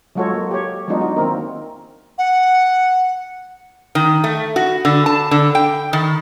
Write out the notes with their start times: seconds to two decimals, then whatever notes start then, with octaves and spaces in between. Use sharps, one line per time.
0.15 F#3 G#3 F4 F#4 A4 C#5
0.33 A#3
0.51 G4 C#5
0.88 F#3 G#3 B3 D4 D#4 F4
1.00 D4 F#4
1.17 D#3 A#3 C4 A#4
2.18 F#5
3.95 D#3
4.24 A3
4.56 F#4
4.85 D3
5.06 A5
5.31 D3
5.55 G5
5.93 D#3